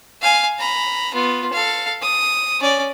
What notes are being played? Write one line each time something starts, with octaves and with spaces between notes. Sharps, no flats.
F5 G#5
A#5 B5
B3 F4
A4 F5
D#6
C#4 D5